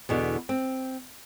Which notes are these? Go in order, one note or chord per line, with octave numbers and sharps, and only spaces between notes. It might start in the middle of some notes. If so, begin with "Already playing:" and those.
E2 B2 D3
C4